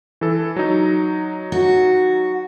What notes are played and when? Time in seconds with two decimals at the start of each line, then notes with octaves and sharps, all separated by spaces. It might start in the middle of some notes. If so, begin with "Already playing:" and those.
0.21 E3 A4
0.56 F#3 D#4
1.52 F#4